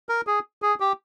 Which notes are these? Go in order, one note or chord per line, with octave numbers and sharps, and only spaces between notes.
A#4
G#4
G#4
G4